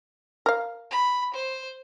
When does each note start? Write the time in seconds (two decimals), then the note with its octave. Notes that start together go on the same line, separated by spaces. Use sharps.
0.46 A#4 F5
0.91 B5
1.34 C5